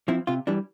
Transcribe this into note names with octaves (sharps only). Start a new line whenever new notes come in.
F3 C4 E4
C3 F4
E3 G3 D4